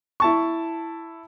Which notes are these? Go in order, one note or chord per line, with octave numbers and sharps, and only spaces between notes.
E4 A5 C#6